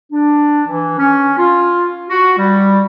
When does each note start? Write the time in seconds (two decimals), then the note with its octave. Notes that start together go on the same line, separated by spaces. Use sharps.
0.12 D4
0.67 E3
0.99 C#4
1.38 F4
2.10 F#4
2.38 G3